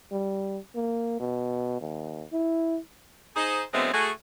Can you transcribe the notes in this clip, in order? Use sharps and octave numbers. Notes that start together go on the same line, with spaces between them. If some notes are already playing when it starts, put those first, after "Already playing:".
G3
A#3
B2
D#2
E4
D#4 G#4 C5
D3 F#3 G#3 A3 B3 C4
A3 F#4 G#4